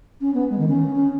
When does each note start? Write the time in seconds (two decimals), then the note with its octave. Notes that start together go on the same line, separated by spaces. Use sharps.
0.21 C#4
0.34 B3
0.50 G#3
0.59 D#3
0.69 C#4
0.96 C#4